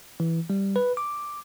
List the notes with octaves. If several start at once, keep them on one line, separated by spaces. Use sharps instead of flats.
E3
G3
B4
D6